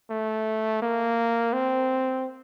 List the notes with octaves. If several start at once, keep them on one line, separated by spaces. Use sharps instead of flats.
A3
A#3
C4